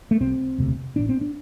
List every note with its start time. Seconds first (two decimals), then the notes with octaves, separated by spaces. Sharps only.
0.11 A3
0.20 C2 C3 C4
0.58 E1 D2 C3
0.96 A1 A2 D4
1.09 C4
1.21 D4